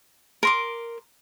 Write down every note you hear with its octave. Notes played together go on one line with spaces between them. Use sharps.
A#4 C6 D6